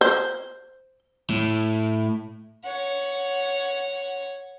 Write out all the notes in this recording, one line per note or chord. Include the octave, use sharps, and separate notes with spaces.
C5
A2
C#5 F#5